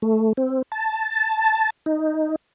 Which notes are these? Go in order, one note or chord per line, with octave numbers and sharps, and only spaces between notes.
A3
C4
A5
D#4